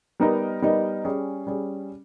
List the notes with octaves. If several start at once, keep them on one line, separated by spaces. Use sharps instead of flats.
G3 B3 D#4 A#4 D#5
G3 B3 D#4 A#4 D#5
G3 C#4 G#4
G3 C#4 G#4